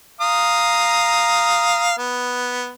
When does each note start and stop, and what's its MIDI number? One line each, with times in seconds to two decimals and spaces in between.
0.21 1.93 77
0.21 1.93 82
0.21 1.93 87
1.98 2.70 59